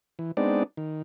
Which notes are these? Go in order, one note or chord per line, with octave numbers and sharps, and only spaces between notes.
E3
G#3 B3 C4 D4 D#4 D5
D#3